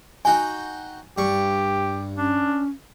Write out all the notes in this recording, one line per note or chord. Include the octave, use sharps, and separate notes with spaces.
D#4 F#4 G5 G#5
G2 G4 C#6
C#4 D4